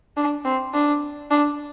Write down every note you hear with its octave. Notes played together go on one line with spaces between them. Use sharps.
D4
C4
D4
D4